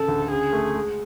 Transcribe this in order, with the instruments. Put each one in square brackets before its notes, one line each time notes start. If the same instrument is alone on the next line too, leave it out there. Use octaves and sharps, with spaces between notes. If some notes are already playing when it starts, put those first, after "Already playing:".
Already playing: [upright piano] A1 C#3 [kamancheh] A4
[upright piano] D2
[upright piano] C#3 [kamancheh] G#4
[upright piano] A3
G#3